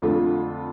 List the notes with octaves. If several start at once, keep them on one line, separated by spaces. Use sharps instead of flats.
F2 D3 A3 F4